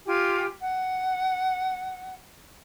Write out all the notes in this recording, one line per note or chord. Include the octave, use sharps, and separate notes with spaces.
F4 G4 G#5
F#5